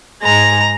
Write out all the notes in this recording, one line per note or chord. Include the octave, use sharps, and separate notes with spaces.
G#2 G#3 A#5